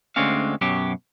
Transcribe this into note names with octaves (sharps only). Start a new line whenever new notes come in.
D2 D3 G#3 C4 C#4 F5
F#2 B2 F#3 G4